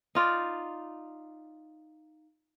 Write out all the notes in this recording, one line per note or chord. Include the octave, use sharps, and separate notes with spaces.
D#4 F4 D5